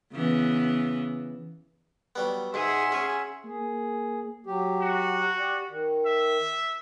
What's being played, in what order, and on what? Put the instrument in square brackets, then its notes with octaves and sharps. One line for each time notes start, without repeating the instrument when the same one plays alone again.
[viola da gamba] C#3 E3 B3
[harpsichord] F#3 G3 B3
[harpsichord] G#2 [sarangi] G#4 [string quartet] E5 F#5 C6
[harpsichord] C#4 [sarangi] G#4
[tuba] A#3 [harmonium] G#4
[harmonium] F#3 G4
[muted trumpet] F#4
[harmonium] G4 D5
D#3
[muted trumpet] E5